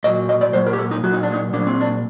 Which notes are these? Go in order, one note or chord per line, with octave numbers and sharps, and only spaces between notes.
A#2 F#3 D#5
D#5
D5
A#2 F#3 C5
A#4
G4
A4
D#4
A#2 F#3 F#4
D#4
D4
D#4
A#2 F#3 D4
C4
D4